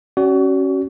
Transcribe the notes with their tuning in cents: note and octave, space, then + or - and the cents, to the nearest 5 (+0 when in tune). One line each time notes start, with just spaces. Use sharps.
C#4 -15 F#4 +30 D5 -40